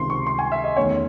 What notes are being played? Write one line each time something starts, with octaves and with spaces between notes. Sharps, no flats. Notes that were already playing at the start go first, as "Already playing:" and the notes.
Already playing: C#2 C3 D#3 C6
C#6
C6
G#5
E5
D#5
E2 D#3 A3 C#4 C#5